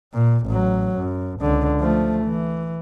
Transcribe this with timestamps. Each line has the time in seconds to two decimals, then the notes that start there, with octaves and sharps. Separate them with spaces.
0.13 A#2
0.46 A1 F#3
0.98 F#2
1.40 C#2 D3
1.80 F3 A3
2.24 E3